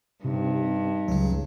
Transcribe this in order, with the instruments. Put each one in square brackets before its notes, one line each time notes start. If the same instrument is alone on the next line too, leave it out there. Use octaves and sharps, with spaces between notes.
[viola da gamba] G2 [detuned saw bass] C3 [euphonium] D#4
[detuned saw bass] C#2 [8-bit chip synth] C#3 F#3